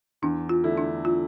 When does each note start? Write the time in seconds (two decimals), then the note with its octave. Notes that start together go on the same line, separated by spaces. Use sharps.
0.22 E2 D4
0.49 F4
0.64 D3 A3 E4
0.77 D4
1.05 F4